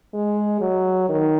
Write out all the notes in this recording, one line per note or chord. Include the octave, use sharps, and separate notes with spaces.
G#3
F#3
D#3